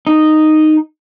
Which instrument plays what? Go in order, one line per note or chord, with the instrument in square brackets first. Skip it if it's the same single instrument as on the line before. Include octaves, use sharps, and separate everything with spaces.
[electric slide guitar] D#4